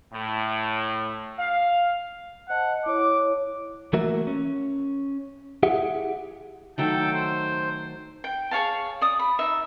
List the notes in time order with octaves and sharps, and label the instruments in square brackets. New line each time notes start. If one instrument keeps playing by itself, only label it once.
[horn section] A2
F5
[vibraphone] C5 D#5 A5 [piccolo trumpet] F#5
[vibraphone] E4 C#5 [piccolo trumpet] D6
[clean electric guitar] E3 A3 A#3 F#4 A#4 E5
C#4
E4 G4 G#4 E5 F#5
[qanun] D#3 F#3 A3 [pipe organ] A4 G5
[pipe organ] C5
[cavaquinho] G5
G#4 C#5 F5 A5
D5 D#6
B5
D#4 E5